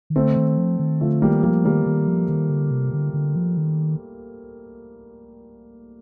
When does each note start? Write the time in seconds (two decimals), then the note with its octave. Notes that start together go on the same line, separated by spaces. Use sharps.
0.10 D#3
0.16 D3 A3 C4
0.37 D#3
0.58 F3
0.79 D#3
1.01 D3 F3 A3
1.22 D#3 G3 A#3
1.43 F3 G3 A#3
1.65 D#3 G3 A#3
1.86 D#3
2.07 F3
2.29 D#3
2.50 D3
2.71 C3
2.93 D3
3.14 D3
3.36 F3
3.57 D#3